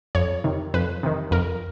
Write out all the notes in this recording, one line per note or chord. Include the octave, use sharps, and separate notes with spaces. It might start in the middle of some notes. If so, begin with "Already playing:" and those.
F2 C#5
C3 D#3
F2 B4
C3 D#3
F2 A#4